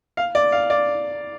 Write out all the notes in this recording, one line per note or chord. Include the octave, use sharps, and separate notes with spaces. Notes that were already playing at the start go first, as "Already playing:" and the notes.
F5
D5
F5
D5